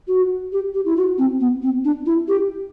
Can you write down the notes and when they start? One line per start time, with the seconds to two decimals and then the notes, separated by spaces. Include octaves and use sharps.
0.08 F#4
0.52 G4
0.74 G4
0.85 E4
0.97 F#4
1.18 C4
1.40 B3
1.62 C4
1.85 D4
2.06 E4
2.28 G4